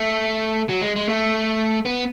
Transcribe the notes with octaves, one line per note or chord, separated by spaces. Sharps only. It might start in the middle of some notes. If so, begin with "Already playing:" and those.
Already playing: A3
F#3
G#3
G#3
A3
B3